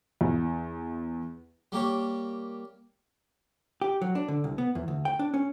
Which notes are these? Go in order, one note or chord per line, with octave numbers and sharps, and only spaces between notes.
E2
G3 A#3 G4 C#5
G4
F#3
D4
D3
C2
B3
E2
D2
G5
D4
C#4